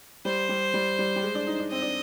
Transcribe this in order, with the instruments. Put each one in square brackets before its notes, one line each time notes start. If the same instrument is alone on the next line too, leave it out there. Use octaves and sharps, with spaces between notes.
[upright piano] G3 [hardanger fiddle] C5
[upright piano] G3
G3
G3
G3
G#3
D4
D#4
D4
[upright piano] C4 [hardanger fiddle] D#5
[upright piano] D4